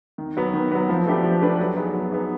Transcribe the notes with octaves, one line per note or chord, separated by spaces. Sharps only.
D#3
F#3 B3
D#3
F#3 B3
F3
A3 D4 G4 B4
F3
A3 D4 G4 B4
F#3
B3 D#4 G#4
F#3
B3 D#4 G#4